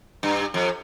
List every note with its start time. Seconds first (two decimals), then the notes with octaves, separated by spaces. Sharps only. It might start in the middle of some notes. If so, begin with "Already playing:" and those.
0.23 G2
0.54 F2